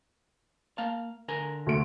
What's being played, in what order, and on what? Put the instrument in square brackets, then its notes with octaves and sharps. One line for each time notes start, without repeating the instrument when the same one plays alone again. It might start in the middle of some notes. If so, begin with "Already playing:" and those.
[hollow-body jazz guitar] A#3 F5 A5
D3 A#4 G#5
[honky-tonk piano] D2 A3 D7